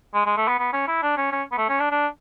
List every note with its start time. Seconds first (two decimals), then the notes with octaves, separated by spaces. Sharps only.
0.14 G#3
0.26 G#3
0.37 A3
0.48 B3
0.59 B3
0.73 C#4
0.88 E4
1.02 D4
1.17 C#4
1.32 C#4
1.52 B3
1.58 A3
1.69 C#4
1.80 D4
1.91 D4